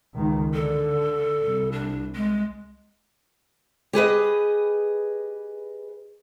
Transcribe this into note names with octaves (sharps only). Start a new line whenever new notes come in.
C#2 D#3
D3 A4
C2
D4
G#3
G4 G#4 B4 D#5